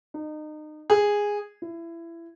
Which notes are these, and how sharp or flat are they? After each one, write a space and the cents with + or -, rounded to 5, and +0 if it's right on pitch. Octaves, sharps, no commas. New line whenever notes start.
D#4 -30
G#4 -10
E4 +25